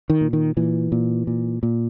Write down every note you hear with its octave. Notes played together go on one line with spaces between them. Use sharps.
D#3
A#2
D#3
A#2 E3
A#2
A#2
A#2